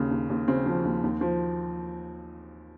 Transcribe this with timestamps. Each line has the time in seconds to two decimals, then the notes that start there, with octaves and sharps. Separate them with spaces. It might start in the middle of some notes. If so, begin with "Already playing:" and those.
Already playing: D#2 C#3
0.11 D#2
0.30 D#2
0.48 C#3 C4
0.66 F3
0.85 D#2
1.03 D#2
1.21 F3